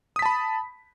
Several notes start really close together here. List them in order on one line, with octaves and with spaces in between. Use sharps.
D#6 B6 A5 B5